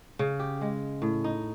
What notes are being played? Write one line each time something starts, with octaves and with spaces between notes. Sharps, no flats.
C#3
G4
G#3
A2
D#4